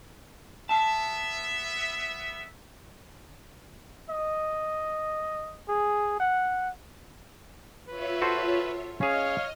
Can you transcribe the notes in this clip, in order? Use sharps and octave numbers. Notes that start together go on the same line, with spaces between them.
B3 E5 A5
D#5
G#4
F#5
F4 B4 C#5 E5
F#4 A4 C5
C#4 G#4 C#5 D#5 F5 F6